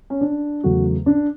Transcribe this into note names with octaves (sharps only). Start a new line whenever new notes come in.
C#4
D4
E2 C#3 F#3 A3 F#4
D4